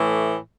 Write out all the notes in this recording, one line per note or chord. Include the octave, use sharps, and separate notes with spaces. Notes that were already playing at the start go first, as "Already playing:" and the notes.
Already playing: A2 E3 A3